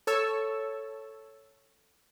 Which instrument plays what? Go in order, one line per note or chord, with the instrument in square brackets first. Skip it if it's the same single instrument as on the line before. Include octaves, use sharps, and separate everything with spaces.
[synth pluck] A4 C#5 A5 C#6 E6